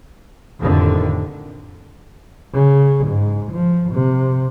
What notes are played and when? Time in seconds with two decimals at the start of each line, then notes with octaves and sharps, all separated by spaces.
0.60 F1 F2 A2 D3 D#3
2.54 C#3
3.06 G#2
3.51 F3
3.92 C3